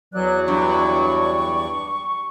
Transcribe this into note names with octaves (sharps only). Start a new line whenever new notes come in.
E2 E3 F#3 D5 F#6
G2 C#6